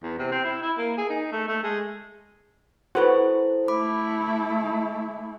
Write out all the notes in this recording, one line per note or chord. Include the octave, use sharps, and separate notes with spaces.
E2
C3
C4
E4
E4
A#3
G#4
D#4
A3
A3
G#3
E4 F#4 A4 B4 C5
A3 E4 B5 D6